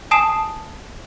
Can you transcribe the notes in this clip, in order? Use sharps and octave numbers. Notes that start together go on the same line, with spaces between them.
G#5 A5 D#6 C7 E7